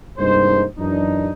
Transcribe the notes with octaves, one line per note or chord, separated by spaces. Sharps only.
C2 G2 G#3 A#3 D#4 C5
F#2 E3 D4 D#4